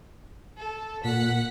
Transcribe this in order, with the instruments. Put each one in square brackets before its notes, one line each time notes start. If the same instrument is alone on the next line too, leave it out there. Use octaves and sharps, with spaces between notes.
[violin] A4
[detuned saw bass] A#2 [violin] F#5 B6